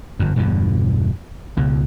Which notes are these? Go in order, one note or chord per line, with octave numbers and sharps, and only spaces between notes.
G1 F2
E1 G2 B2 D3
C#2 B2